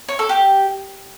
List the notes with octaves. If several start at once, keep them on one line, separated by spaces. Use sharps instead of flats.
C#5
A4
G4